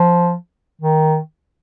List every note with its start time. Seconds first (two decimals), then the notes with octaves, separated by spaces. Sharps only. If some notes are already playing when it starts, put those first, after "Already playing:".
Already playing: F3
0.82 D#3